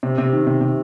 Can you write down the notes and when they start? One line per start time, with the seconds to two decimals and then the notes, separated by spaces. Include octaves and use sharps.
0.03 C3
0.18 C3
0.32 D#3
0.47 C3
0.61 C3